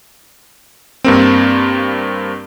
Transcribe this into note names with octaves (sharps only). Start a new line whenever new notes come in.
G2 A#3 C4